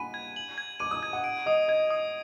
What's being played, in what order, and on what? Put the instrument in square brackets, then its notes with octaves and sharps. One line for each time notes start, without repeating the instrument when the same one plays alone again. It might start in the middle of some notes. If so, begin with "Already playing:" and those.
Already playing: [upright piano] F#5 G#5 B5 [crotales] D#7
[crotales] G#6
F#7
G#6
[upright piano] D6 [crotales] D#7
[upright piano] D#6
[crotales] G#6
[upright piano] F#5
[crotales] D7
[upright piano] D#5 [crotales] D#6
[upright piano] D#5 [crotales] G#6
[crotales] D#6